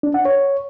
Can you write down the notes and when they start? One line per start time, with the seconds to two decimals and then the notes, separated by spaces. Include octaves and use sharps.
0.03 D4
0.14 F#5
0.25 C#5